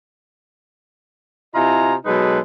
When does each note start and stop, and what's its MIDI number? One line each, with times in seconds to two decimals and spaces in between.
1.55 1.94 48
1.55 1.94 64
1.55 1.94 65
1.55 1.94 75
1.55 1.94 80
1.55 1.94 82
2.05 2.39 47
2.05 2.39 54
2.05 2.39 56
2.05 2.39 63
2.05 2.39 69
2.05 2.39 71